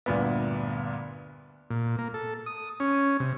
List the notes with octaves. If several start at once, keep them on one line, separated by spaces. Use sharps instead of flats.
D2 G2 A#2 G3 B3
A#2
A#3
A4
D#6
C#4
C3